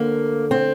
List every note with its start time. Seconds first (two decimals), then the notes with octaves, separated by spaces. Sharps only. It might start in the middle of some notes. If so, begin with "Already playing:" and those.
Already playing: D2 D3 A#3
0.51 C4